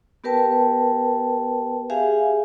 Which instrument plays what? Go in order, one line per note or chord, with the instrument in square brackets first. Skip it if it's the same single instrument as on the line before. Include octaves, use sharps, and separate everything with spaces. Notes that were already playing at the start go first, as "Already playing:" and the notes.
[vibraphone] B3 G4 A#4 B4 G5 A5
G4 G#4 E5 F5 G#5